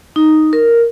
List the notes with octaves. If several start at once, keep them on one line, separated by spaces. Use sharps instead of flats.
D#4
A#4